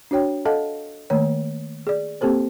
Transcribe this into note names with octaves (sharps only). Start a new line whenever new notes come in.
D4 F#4 C#5 G5
A4 D#5 F5 F#5 A5
D#3 A3 A#3 C#5
G#4 D5
A#3 C4 G4 A4 C5